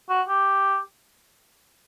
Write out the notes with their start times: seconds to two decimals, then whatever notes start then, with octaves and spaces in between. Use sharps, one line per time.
0.10 F#4
0.28 G4